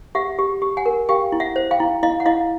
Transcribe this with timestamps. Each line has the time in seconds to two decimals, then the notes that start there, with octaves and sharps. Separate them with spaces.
0.15 G4 E5 F#5
0.39 G4
0.62 G4
0.77 F#5 G#5
0.86 A#4
1.09 G4 F5 G5
1.32 E4
1.40 E5 F#5
1.56 C5
1.71 F5 G5
1.80 E4
2.03 E4 D#5 F5
2.20 F#5
2.26 E4 D#5 F5